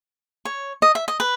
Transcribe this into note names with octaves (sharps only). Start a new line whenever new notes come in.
C#5
D#5
E5
D#5
B4